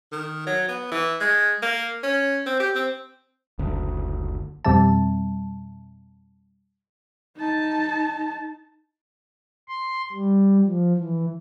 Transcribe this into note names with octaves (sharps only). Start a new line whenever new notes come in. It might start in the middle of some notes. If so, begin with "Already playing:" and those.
D#3
F#3
B3
E3
G#3
A#3
C#4
C4
G4
C4
F#1 D2
F2 B2 G3 C4 E5 A5
D#4 A5
C6
G3
F3
E3